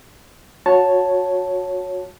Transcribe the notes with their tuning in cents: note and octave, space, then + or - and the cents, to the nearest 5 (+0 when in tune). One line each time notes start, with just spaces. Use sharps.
F#4 -25 C#5 +0 A5 +0